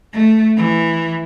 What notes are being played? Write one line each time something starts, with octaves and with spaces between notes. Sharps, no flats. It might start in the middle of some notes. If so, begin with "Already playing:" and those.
A3
E3